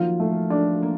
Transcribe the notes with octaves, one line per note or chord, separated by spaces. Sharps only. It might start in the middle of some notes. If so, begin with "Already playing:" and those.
Already playing: D#3 F3 F#3 A#3 F4
A3
D4
A#3